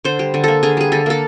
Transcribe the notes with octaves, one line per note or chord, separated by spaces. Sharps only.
D3 C5
G3
D3
A#3 A4
D3 G#4
G3 G#4
D3 A4
A#3 A4